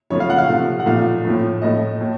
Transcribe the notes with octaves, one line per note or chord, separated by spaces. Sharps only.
C#3 F3 A3 C#5
F5
F#5
F5
C3 F3 A3
F#5
A#2 F3 A3 F5
A2 F3 A3
A2 A3 D#5
A2